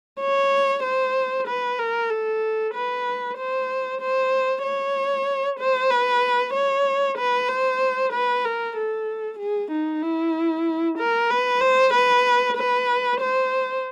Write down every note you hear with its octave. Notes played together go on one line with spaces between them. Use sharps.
C#5
C5
B4
A#4
A4
B4
C5
C5
C#5
C5
B4
C#5
B4
C5
B4
A#4
A4
G#4
D#4
E4
A#4
B4
C5
B4
B4
C5